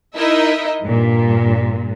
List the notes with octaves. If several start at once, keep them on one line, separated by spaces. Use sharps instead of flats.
D#4 E4 A#4 D#5 E5
G2 A#2